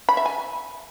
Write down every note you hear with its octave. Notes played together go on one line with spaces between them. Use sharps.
B5
E5
G#5